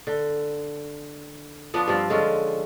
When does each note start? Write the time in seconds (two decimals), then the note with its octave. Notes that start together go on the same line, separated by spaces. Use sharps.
0.07 D3
1.74 F3 B3 D4
1.88 G2 F3 C4
2.10 D3 G#3 C#4 F4